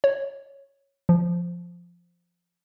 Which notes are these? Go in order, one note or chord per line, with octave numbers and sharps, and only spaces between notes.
C#5
F3